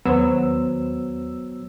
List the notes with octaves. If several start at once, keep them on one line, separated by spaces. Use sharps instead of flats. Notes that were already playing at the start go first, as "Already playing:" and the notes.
D#2 F#3 B3 C5 E6